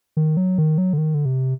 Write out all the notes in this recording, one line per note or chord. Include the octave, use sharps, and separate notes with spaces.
D#3
F#3
D#3
F#3
D3
D#3
D3
C3